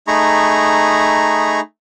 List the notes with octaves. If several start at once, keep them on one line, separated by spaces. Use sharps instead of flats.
A3 D#4 G#4 A#5 B5 C#6